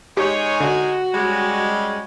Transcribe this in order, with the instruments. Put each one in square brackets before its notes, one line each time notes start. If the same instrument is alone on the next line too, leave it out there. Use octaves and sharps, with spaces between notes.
[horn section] G#3 D#4 G#5 [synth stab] G4 [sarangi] C#5
[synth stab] D3 [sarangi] F#4
[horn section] G3 G#3 C#4